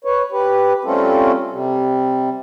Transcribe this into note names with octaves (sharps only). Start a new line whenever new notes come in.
B4 C#5
G4 B4
G3 A3 C4 C#4 F4 A4
C3 G3